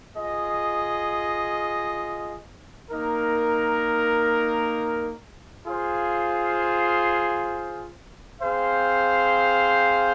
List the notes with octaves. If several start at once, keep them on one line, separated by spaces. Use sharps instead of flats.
F4 G#4 D#5
A#3 D#4 A#4
F4 G#4 C5 F5
C4 G#4 C5 F5